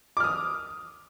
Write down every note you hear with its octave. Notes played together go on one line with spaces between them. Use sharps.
D6 D#6 F6